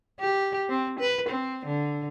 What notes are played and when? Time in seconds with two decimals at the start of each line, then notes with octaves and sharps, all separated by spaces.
0.20 G4
0.69 C4
0.99 B4
1.29 C4
1.66 D3